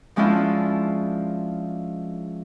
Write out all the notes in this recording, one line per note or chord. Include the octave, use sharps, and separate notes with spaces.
F3 G#3 C#4 D4 E4 F4